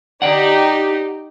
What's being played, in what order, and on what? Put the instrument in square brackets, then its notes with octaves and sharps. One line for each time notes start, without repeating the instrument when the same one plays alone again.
[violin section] D#4 G4 [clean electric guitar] D5 F#5